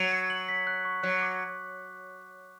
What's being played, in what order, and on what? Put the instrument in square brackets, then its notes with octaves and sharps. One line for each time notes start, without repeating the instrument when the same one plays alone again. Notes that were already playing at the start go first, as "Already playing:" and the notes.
Already playing: [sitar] F#3
[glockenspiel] C#7
F#7
B6
F#6
C#6
[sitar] F#3 [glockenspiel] F#6
[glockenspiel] D6